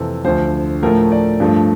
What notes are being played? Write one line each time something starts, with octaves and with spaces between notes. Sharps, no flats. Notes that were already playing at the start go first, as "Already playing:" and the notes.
Already playing: F2 C3 E3 A4
D2 D3 F3 C5
A2 F3 A3 A#4
D5
G2 F3 A3